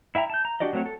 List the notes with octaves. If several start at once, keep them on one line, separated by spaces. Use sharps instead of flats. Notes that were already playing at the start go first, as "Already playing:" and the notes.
E4 E5 G5 A#5
A5 G6
A#5
D4 F#4 G4 D5 D#5
F#3 A3 C4 F#4 C#5
A4